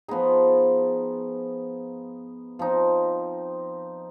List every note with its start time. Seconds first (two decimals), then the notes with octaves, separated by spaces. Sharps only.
0.08 F3 B3 D#4 G#4
2.59 F3 C4 D#4